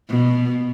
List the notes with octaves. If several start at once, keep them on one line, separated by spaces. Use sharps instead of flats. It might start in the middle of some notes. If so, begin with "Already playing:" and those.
B2